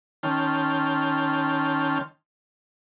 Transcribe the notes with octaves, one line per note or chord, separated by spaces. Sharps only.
D#3 C#4 G5 A5 C6 F6